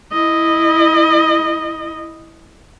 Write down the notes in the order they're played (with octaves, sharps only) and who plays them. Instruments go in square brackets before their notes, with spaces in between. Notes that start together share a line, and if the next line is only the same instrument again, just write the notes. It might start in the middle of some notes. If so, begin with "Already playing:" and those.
[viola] E4 D#5